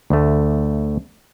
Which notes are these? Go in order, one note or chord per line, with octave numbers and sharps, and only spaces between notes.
D2 A3